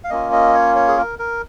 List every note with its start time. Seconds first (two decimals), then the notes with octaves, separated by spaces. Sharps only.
0.04 F5
0.10 A#3 C#4 F4 D#5
0.32 D#5
0.54 C#5
0.76 C#5
0.88 G#4
0.97 A#4
1.19 A#4